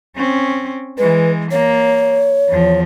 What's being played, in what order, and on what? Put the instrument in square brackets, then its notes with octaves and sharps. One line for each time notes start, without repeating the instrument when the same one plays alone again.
[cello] C4 C#4
[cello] E3 G#3 [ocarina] B4
[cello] A#3 [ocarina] C#5
[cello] E2 F3